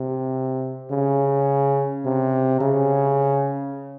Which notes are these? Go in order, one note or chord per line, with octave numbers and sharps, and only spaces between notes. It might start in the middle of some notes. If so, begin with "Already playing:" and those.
Already playing: C3
C#3
C3
C#3